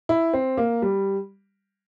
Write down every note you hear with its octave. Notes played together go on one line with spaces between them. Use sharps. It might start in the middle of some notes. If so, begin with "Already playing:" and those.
E4
C4
A#3
G3